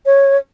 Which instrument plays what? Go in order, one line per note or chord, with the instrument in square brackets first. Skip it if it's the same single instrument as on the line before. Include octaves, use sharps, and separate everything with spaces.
[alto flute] C#5